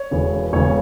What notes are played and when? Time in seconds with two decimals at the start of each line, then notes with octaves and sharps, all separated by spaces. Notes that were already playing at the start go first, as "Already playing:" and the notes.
Already playing: C#5
0.11 E1 E2 C#3
0.53 E1 E2 C#3 C#5